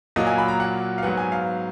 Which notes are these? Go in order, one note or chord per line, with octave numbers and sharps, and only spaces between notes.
A#2 F#3 A#3 D#5
G#5
B5
A#5
F#5
F5
G#2 F#3 B3 F#5
G#5
F5